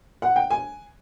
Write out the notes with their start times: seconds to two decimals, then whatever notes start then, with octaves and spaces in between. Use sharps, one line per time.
0.22 F#5
0.36 G5
0.50 G#5